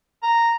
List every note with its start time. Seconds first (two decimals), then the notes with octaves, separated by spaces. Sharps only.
0.23 A#5